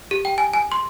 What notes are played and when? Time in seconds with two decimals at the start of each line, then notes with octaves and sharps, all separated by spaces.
0.11 G4
0.25 G5
0.38 G#5
0.53 G#5
0.72 C6